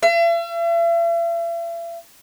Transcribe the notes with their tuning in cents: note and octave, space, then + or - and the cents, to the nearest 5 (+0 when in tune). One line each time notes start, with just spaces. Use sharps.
E5 +45